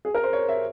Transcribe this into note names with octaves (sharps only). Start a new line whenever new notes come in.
G#4
A#4
C5
C#5
E5